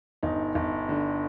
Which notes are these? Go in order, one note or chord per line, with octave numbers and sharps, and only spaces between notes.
G1 D#4
G1
D3